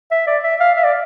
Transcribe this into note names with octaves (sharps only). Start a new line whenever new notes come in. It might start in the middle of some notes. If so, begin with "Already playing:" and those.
E5
D5
E5
F5
E5
D5